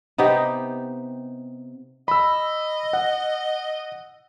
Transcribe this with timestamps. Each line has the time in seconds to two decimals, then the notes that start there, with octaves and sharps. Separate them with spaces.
0.18 C3 B3 D#4 G4
2.08 D#5 B5 E6
2.93 F#5